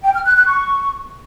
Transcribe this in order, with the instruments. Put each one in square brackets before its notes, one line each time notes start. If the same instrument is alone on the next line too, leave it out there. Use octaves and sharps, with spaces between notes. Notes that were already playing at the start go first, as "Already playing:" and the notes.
[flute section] G5
F6
F#6
F#6
C#6